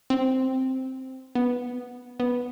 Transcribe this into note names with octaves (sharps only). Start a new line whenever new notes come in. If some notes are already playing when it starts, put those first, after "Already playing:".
C4
B3
B3